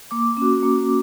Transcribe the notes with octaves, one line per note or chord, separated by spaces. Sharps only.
A#3 D6
C#4 F#4
A#3